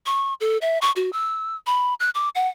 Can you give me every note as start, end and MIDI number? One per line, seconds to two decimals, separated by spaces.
0.06 0.34 85
0.41 0.58 69
0.61 0.78 76
0.82 0.91 85
0.96 1.10 66
1.13 1.56 88
1.67 1.94 83
2.00 2.10 90
2.15 2.29 86
2.35 2.48 78